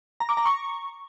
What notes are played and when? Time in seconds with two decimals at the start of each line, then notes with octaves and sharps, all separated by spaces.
0.20 A#5
0.29 D6
0.37 A#5
0.45 C#6